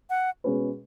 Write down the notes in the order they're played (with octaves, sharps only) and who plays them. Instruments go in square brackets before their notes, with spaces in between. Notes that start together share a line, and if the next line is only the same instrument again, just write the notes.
[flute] F#5
[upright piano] B2 G#3 C#4 G#4 B4